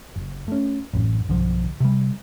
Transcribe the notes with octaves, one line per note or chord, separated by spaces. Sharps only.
F#1
A3 C#4
A1 F#2
B1 G2 D3 F3
C3 G3